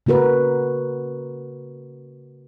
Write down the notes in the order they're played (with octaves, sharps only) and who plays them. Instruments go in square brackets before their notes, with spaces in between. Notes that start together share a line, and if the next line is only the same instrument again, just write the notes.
[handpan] C#3 A#3 F#4 A#4 B4